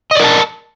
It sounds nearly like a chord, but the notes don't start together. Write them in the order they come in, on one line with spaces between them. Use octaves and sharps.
D#5 D5 A#4 A5